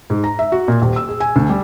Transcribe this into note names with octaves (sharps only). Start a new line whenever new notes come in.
G#2
A#5
E5
F#4
A#2
D#1
E6
G#4
G#5
D2
G3